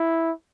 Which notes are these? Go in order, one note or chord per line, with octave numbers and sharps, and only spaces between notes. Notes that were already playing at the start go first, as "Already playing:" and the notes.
Already playing: E4